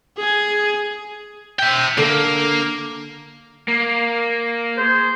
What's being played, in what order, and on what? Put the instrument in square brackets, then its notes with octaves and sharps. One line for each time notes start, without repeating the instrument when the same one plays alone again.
[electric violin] G#4 G#5
[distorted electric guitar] E5 G5
[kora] D3 [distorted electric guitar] A#3
[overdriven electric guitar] A#3
[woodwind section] G#4 C5